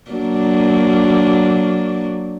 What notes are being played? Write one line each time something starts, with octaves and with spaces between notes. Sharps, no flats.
F#3 A#3 D4